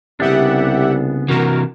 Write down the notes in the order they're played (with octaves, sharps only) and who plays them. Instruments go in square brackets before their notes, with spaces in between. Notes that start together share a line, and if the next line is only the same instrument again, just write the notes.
[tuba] C2 [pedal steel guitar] C#3 B3 D4 [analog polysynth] G4 E5 F#5
[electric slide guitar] C3 E3 [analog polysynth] F#4 A#4